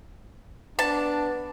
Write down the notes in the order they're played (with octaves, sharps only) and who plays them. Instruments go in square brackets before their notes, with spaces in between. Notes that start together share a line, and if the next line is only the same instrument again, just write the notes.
[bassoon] B3 [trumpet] D4 [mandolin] A5